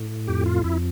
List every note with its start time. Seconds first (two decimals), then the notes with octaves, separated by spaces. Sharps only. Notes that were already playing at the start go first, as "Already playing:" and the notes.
Already playing: A2
0.27 F2 G4
0.46 F4
0.64 F2 E4